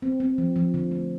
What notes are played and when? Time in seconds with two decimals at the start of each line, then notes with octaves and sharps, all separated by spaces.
0.02 C4
0.20 C4
0.38 F3
0.56 F3
0.74 D3
0.91 A3